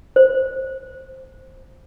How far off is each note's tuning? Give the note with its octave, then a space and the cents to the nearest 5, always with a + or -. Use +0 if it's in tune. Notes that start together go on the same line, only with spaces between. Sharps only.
C5 +5